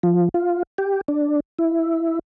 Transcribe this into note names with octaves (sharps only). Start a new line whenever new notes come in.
F3
F4
G4
D4
E4